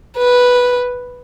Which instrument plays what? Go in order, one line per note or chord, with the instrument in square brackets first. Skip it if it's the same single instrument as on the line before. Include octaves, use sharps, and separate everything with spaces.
[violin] B4